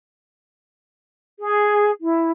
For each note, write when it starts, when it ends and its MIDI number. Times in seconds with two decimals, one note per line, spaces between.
1.40 1.90 68
2.01 2.31 64